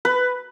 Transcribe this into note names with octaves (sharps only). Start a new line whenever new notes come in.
B4